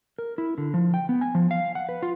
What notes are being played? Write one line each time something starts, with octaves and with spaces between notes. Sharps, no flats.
A#4
E4
D3
F3
G5
B3
G#5
F3
F5
F#5
B4
F4